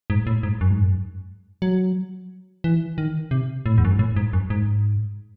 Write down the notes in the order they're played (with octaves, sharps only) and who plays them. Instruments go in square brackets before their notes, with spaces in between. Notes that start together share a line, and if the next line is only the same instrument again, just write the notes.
[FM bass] G#2
A2
G#2
F#2
G#2
F#2
F#3
E3
D#3
C3
A2
E2
F#2
G#2
A2
G#2
F#2
G#2